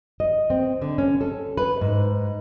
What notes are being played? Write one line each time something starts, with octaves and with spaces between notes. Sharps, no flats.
D#5
C4
D3
C#4
A4
B4
G#2